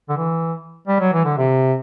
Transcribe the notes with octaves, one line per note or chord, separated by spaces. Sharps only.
D3
E3
G3
F#3
E3
D3
C3